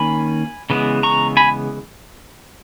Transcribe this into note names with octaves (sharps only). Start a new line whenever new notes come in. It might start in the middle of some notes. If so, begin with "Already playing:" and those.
Already playing: D#3 A#3 C#4 G#5 B5
C#3 E3 G#3 B3
A#5 C#6
G#5 B5